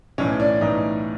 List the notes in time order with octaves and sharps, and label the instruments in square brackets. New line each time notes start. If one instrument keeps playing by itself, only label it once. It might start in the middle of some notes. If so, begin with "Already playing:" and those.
[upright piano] B1 A2 E3 C#4
D4
B1 A2 E3 D#4